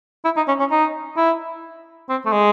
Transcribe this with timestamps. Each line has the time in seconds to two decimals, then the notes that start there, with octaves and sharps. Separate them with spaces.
0.25 E4
0.37 D#4
0.48 C#4
0.59 C#4
0.71 D#4
1.17 E4
2.09 C4
2.25 A3
2.32 G#3